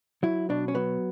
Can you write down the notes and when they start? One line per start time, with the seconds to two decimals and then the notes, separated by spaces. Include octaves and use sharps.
0.23 F#3 E4
0.49 B2 D4
0.68 C#4
0.75 F#3 B3